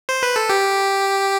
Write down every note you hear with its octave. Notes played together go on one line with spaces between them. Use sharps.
C5
B4
A4
G4